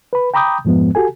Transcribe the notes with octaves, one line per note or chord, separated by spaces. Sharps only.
B4 B5
G5 A#5 B5 D6 D#6 G6
F2 G#2 F3 G#3 B3
F#4 G4 A4 G#5